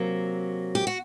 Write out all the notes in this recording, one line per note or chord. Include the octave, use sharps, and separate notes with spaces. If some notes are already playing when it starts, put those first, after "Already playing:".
Already playing: C3 F#3 A#3
G4
F#4